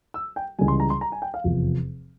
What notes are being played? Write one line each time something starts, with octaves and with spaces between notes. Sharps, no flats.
E6
G5
C#2 C#3 E3 G3 G#5
C6
A#5
C6
A#5
G#5
G5
F5
F1 E2 C3 F3